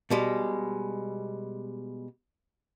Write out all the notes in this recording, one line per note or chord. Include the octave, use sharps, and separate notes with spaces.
B2 G3 G#3